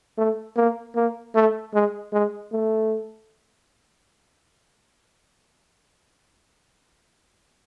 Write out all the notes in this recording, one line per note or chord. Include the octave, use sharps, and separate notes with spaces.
A3
A#3
A#3
A3
G#3
G#3
A3